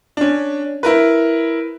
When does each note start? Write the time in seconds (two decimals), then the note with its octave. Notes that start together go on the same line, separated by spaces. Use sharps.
0.17 C#4 D4
0.83 E4 A#4 B4